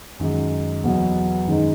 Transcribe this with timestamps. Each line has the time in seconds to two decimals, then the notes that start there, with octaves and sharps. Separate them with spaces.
0.20 F#2 D#3 G#3 D#4
0.84 E2 B2 F#3 B3
1.47 F#2 D#3 G#3 D#4